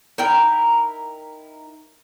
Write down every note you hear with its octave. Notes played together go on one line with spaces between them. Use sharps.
D#4 E4 A#4 G5